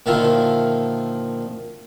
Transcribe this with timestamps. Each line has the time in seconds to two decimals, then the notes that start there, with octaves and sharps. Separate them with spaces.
0.06 A#2 D3 D#3 F3 E4